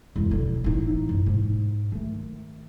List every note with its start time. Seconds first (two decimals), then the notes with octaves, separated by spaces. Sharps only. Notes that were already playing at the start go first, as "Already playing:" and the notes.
0.16 E1 F#2
0.31 D3 F3
0.64 A1 D#4
1.09 F#2
1.26 G#2
1.92 D#3 A3